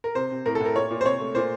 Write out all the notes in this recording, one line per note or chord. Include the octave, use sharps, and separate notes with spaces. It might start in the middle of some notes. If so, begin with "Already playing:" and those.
A#4
C3 C5
C3
A2 A#4
A4
A2 A#4
A#2 C#5
A#2
C5
C3 C#5
A3
A#2 C5